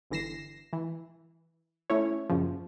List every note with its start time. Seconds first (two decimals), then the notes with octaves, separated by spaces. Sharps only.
0.11 G1 D3 E3 A#6 C7 E7
0.73 E3
1.90 A3 C#4 E4 C#5
2.30 F#2 A#2 C#3 F3